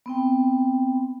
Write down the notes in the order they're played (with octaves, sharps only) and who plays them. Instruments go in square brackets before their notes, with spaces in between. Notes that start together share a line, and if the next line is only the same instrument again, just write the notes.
[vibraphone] B3 C4 G5